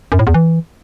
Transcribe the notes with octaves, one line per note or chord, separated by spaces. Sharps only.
F#2
A2
E2
E3